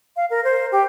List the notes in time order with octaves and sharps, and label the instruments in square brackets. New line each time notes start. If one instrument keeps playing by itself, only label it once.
[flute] F5
A#4
C5
G4